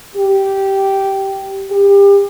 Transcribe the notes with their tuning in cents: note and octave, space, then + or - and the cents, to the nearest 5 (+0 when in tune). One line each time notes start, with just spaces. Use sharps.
G4 -10
G4 +30